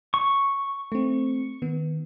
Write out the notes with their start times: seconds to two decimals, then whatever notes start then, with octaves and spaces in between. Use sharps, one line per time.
0.14 C#6
0.92 A3 C4
1.62 D#3 B3